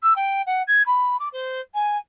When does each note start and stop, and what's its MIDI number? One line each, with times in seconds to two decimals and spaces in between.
0.03 0.14 88
0.16 0.42 79
0.47 0.63 78
0.68 0.83 92
0.87 1.17 83
1.20 1.29 86
1.33 1.61 72
1.75 1.97 80